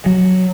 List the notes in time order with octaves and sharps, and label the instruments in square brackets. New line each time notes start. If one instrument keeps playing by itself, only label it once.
[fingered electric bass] F#3